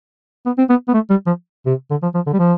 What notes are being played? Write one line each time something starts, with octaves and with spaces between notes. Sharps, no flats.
B3
C4
B3
B3
A3
G3
F3
C3
D3
F3
F3
D3
G3
F3